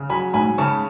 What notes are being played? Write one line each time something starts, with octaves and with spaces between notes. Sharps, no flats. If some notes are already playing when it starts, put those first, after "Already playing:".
Already playing: C#3
F#3 G#5 B5
G#2 G#5 B5
C#3 A5 C#6